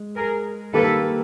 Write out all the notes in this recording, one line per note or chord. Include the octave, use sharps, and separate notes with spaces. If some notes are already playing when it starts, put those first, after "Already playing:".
Already playing: G#3
G#4 A#4
D#3 G3 A#3 A4 B4